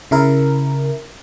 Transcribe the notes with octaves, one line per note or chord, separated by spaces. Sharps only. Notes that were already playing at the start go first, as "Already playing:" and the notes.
C#3 E4 A#4